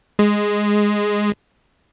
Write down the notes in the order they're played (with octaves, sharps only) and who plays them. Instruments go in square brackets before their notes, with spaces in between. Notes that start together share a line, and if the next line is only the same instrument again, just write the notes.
[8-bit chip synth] G#3